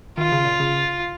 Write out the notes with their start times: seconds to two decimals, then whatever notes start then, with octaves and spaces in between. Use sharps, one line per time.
0.17 D#3 F4
0.32 C#3
0.45 A#2
0.60 C#3